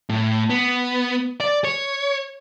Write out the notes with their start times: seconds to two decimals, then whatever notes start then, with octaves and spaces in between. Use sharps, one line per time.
0.09 A2
0.50 B3
1.40 D5
1.64 C#5